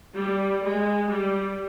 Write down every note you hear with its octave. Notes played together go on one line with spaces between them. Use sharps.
G3
G#3
G3